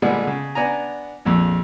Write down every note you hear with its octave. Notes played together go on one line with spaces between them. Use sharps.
A#2 D3 G3 G#3 B3
C#3
B3 D4 G#5 A#5
A#1 F2 A#2